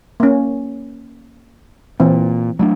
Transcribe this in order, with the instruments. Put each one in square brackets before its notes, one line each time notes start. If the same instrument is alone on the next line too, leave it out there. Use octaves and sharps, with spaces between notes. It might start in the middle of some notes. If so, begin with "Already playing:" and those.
[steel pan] A#3 C#4
[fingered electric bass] A#2 [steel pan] E3 C4
[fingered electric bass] F#3 A3 D4